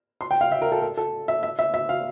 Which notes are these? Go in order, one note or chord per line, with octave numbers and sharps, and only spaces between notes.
C6
G5
F5
E5
A#4
A4
A4
A4
E5
E5
E5
E5
F5